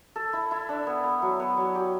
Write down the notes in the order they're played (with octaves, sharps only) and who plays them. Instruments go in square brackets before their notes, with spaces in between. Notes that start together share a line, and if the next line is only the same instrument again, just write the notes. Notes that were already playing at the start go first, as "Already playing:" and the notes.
[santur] A4
E4
E4
D4
B3
B3
F#3
B3
F#3
G4